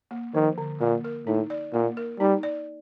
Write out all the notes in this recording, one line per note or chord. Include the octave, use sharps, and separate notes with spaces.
A#3
D#3 F3
D3
A#2 A#3
A#4
A2 D#4
D5
A#2 A#3
A#4
G3 D#4
D5